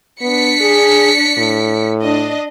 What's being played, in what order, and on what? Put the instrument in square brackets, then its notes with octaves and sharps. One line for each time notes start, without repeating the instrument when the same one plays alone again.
[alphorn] B3 [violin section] D4 B6 C#7
[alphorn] G#4
A2
[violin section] D4 D#5